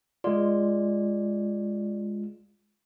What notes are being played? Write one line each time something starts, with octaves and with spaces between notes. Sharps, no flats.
G#3 F4 D5